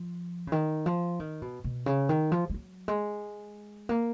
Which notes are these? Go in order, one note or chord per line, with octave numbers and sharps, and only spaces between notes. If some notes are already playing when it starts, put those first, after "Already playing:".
Already playing: F3
C#3
D#3
F3
D#3
B2
B2
C#3
D#3
F3
G#3
F#3
G#3
A#3